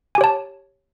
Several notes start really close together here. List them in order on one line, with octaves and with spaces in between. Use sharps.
G#5 G4 C#5 A5